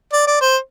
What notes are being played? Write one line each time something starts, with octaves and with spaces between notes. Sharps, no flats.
D5
D5
C5